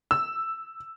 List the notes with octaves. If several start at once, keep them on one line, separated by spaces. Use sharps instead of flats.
E6